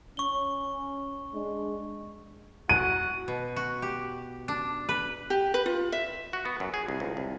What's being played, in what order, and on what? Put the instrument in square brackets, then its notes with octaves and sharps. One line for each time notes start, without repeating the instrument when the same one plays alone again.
[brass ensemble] C#4 [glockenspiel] C#6 G7
[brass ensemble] G#3 D4
[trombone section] F#4 [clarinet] F#5 [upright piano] D#7
[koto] B2
F#4
G4
D4
B4
[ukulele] G4
B4
F4
E5
[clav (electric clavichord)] F#4
B3
F#2
G#4
C2
C#2
C2